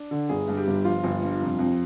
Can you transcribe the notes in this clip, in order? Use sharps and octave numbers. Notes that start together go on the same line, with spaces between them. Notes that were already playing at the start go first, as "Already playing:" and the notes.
Already playing: D4
D3
G1 G#4
G2
G4
G1
F3 F4
G1
G2
F1
F2